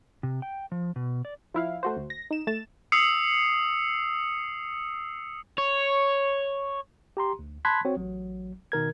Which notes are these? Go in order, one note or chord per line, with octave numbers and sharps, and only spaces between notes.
C3
G5
F3
B2
D5
F3 E4 F5
A3 F#4 C5
D2
A#6
D#4 E7
A3 A6 E7
D#6 E6 C7 C#7
C#5
G4 A#5 C6
D2
A5 B5 C6 F#6 G#6 B6
C4 F#4 C#5
A1 F#3
B2 D#3 A#4 G#6